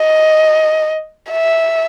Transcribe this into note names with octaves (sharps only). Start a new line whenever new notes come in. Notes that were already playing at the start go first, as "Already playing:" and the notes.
Already playing: D#5
E5